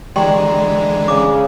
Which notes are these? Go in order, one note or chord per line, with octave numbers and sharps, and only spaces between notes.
D3 E3 G#3 G4 D5 G5 A#5 C6
C#3 D6